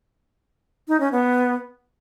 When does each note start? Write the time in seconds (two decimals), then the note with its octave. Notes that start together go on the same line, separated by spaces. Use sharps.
0.88 D#4
1.00 C#4
1.12 B3